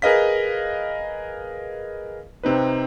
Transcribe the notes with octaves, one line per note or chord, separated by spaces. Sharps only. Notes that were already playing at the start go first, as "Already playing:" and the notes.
G#4 A#4 B4 D#5 F5 B6
C3 C4 D#4 B4